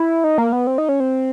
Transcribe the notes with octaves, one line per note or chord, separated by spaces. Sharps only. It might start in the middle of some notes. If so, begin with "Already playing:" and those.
Already playing: E4
D#4
A#3
B3
C4
D#4
C#4
C4